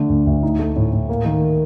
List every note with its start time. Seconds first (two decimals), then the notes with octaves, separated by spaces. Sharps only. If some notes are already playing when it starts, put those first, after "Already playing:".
Already playing: D3 A3
0.09 D2
0.27 D2
0.43 D#4
0.59 A3
0.76 A2
0.93 A2
1.09 A#3
1.25 D#3